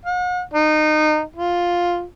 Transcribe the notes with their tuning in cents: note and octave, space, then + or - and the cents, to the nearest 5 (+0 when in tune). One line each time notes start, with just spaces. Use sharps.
F#5 -45
D#4 -25
F4 +5